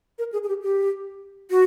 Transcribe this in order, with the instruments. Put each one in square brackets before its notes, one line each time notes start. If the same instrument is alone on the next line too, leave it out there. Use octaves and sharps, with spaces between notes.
[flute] A#4
G#4
G#4
G4
G4
F#4